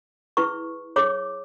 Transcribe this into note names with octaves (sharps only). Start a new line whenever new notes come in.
E4 G#4 B4 C#6
G#4 C#5 D6